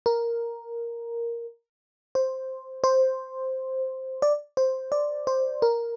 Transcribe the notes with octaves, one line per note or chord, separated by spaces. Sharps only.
A#4
C5
C5
D5
C5
D5
C5
A#4